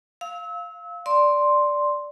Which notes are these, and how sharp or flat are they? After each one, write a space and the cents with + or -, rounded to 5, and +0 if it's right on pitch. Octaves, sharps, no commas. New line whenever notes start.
F5 +0 E6 -30
D5 +0 C6 +0